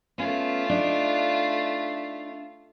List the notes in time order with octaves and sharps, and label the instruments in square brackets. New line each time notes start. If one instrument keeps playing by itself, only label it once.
[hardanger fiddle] A3 F4 [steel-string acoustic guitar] B3 C#4
[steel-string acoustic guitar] D4 D#4